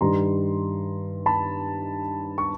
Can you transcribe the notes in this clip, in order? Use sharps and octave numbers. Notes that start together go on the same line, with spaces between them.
G2 D#3 G3 A#5 C6
A5 B5
C#6